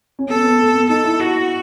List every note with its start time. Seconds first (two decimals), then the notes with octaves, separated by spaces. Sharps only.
0.19 C#4
0.28 B3 A4
0.43 B3
0.59 A3
0.74 B3
0.89 D#4 A4
1.04 E4
1.19 E4 F#4